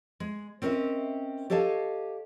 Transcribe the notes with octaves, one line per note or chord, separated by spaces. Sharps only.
G#3
C4 C#4 A#4 D#5 E5
G4 A4 C#5 D#5 F5 A5